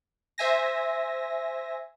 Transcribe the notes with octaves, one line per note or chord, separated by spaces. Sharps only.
C5 E5 G#5 A#6